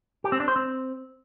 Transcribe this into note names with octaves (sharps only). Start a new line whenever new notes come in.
G4
C4
D4
C5
C4